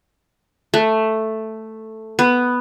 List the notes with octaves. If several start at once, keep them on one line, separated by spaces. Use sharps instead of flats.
A3
B3